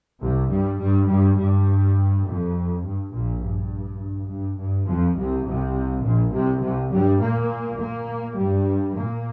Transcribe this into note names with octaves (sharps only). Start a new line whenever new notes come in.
C2 C3
G2 G3
G2 G3
G2 G3
G2 G3
F2
G2
A#1 A#2
G2
G2
G2
F2 F3
C2 C3
C2 C3
A#1 A#2
C2 C3
C2 C3
G2 G3
A#2 A#3
A#2 A#3
G2 G3
A#2 A#3